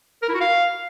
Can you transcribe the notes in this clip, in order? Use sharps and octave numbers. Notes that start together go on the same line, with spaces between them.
A#4
E4
F#4
F5